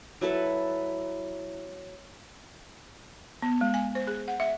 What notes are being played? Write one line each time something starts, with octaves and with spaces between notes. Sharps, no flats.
F#3 E4 A4 B4
B3
G#3
G#5
C5
G#4
F#5
E5